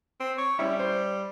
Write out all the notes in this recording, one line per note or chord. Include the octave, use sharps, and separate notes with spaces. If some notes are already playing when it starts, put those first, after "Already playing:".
C4
C#5
G3 C#4 E4
C5